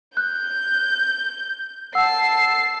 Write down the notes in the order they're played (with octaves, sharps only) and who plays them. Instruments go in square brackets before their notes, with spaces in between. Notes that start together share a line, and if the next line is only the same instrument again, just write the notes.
[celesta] F#6 [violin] G6
[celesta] F#5 E6 [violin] A5 C7